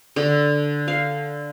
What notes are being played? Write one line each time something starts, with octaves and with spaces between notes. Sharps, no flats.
D3
F5